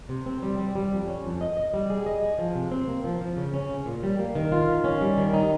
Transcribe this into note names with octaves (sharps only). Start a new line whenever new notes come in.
C3
C4
G3
G3
G3
F2
C#4
F2
D#5
D#5
G3
G#4
D#5
G#4
F3
C3
C4
A#3
F3
F3
C#3
C#4
C#3
A#2
G3
A#3
D#3
F4
D#3
C#4
G3
D#3
D#4